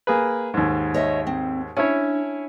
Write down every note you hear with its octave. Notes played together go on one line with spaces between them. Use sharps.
A#3 G#4 B4
D#2 G#2
C#5 D#5 E5
C4
C#4 D4 E4 C#5